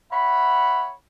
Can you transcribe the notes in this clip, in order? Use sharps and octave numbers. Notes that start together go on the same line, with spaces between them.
C#5 E5 F#5 B5